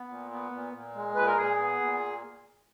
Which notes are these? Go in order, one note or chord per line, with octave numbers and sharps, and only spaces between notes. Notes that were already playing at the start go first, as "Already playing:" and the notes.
Already playing: B3
A#2
B3
A#2
A#2
G#3
A#2 B4
A#4
A#2 G#4
B3
A#2